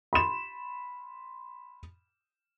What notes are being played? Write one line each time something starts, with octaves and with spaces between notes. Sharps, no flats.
B5 C6 E7